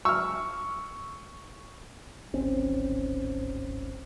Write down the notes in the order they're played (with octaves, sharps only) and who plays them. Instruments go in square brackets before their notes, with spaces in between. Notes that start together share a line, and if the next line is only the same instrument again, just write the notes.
[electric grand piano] C#6 [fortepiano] E6 F6
[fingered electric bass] D1 G#1 C4 C#4